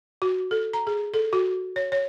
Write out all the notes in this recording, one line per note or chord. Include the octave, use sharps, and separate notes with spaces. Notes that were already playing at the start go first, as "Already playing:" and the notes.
F#4
A4
A#5
G#4
A4
F#4
C#5
C#5